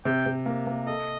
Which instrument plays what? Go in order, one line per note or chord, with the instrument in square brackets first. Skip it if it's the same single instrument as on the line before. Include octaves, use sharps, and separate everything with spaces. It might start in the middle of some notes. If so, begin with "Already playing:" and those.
[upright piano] C3 [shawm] G5
[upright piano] C3
A#3
A#3
[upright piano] A4 [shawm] D#5